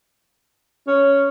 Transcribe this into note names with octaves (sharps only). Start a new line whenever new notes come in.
C#4